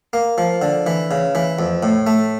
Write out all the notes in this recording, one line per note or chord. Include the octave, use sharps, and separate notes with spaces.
A#3
F3
D3
E3
C#3
E3
F2
A2
A3